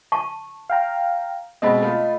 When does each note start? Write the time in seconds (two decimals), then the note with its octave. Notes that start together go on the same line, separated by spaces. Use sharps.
0.12 A5 C#6
0.70 F5 G5 A#5
1.62 B2 G#3 C4 D#5 A5 B5
1.83 A3 F4